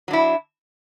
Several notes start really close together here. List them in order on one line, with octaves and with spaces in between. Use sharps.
F#3 D4 E4